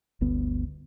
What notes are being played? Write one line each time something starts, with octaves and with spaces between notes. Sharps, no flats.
G1 D2 B3